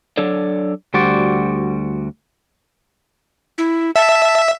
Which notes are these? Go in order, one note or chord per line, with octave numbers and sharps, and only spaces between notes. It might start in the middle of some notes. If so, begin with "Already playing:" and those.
F#3 D4 A4 C#5 D5
D2 G3 F#4 C5 D5
E4
E5 A5